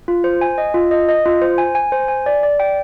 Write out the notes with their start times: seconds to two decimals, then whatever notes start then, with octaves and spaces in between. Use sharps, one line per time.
0.08 F4
0.24 C5
0.41 G#5
0.58 D#5
0.74 F4
0.91 D#5
1.09 D#5
1.26 F4
1.42 C5
1.58 G#5
1.75 G#5
1.92 C5
2.08 G#5
2.26 D5
2.43 D5
2.60 G5